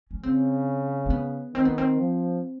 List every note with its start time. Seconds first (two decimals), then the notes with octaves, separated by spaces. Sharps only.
0.11 C#4
0.23 C#3 C4
1.06 C4
1.10 B3
1.54 D#3 C4
1.65 B3
1.78 C4
1.98 F3